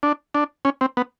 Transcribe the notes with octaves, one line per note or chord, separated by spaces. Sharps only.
D4
D4
C#4
C4
B3